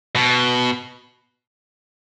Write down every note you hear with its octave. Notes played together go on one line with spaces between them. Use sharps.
B2